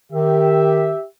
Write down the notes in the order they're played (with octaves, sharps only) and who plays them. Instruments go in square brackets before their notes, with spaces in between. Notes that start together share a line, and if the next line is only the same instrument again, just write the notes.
[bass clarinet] D#3 [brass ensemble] G4 E5